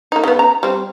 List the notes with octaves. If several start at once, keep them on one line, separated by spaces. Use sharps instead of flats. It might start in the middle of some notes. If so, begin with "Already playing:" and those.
A#3 D#4
C#3 B3
A#5
G3 C4